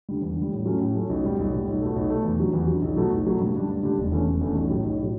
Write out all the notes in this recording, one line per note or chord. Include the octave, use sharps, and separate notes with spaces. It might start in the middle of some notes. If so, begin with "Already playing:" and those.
D3 G3
E2
D3
G3
A2
F#3 A3 C#4
A2
F#3 A3 C#4
B1
B2 G3
B1
B2 G3
B1
B2 A3
B1
B2 A3
E2
D3 F#3
E2
D3 F#3
B1
B2 F#3 A3
B1
B2 F#3 A3
G2
D3 G3 D4 G4
G2
D3 G3 D4 G4
E1
E2 D3 A3 C#4
E1
E2 D3 A3 C#4
B1
A2 F#3
B1
A2 F#3